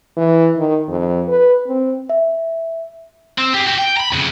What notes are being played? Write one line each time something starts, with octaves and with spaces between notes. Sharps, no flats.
E3
D#3
F2
B4
C4
E5
C4
G4 G#4
F#4 G4
G5
A#5 B5
F2 C#3